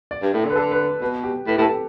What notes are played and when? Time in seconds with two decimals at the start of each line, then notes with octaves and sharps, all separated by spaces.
0.11 D5
0.22 G2
0.34 A2
0.45 D3
0.50 B4
0.56 D3 A4
0.71 B4
1.01 B2 B4
1.23 G4
1.47 A2 B4
1.55 G4
1.58 A2
1.62 A4